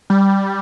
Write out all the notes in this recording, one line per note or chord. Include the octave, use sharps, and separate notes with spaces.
G3